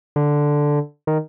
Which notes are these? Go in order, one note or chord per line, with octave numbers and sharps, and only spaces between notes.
D3
D#3